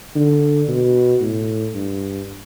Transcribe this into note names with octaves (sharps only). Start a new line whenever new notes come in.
D3
B2
A2
G2